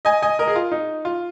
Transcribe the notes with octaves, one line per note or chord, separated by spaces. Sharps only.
D#5 G#5
D#5 G#5
A#4 D#5
G#4
F4
D#4
F4